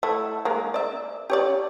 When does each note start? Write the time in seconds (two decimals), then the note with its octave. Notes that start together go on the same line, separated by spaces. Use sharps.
0.03 A3 E4
0.45 G#3 A#3
0.74 D5 E5
1.30 G4 C#5 D5